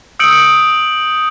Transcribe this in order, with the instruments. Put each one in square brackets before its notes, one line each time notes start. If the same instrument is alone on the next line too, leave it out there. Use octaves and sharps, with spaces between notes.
[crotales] D#6 E6 G6 C#7 D7 F#7